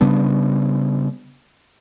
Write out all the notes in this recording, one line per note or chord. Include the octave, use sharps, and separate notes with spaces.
C#3 G3 B3 D4